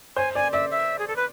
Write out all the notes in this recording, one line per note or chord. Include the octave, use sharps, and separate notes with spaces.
C5 G#5
D5 G#5
D5 E5
E5
G#4
A4
B4